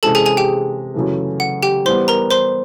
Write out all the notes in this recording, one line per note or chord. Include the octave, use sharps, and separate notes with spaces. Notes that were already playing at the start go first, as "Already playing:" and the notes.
C3 E3 G#3 C#4 A4 A5
G#4 G#5
G#4 G#5
G4 G5
F#2 C#3 E3 A3
F#5
G4 G5
E3 G3 B3 C5 C6
A#4 A#5
C5 C6